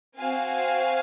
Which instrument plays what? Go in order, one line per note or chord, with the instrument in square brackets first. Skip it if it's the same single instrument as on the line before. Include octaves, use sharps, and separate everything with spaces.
[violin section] C4 F#4 F5 G#5